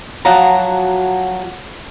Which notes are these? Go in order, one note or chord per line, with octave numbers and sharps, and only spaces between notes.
F3 F#3 F#4 A5 A#5